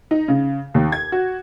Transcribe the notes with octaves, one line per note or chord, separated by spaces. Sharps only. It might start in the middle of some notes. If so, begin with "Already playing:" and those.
D#4
C#3
D#2
G#6
F#4